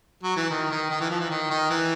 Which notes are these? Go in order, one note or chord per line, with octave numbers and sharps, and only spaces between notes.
F#3
E3
D#3
D#3
D#3
E3
F3
E3
D#3
D#3
E3